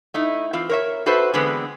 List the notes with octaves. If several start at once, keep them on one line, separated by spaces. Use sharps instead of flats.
A3 D#4 E4
E3 C4 F4
A#4 C#5 E5
F#4 A4 B4 C5 E5
D3 E3 G#3 B3 C4 B4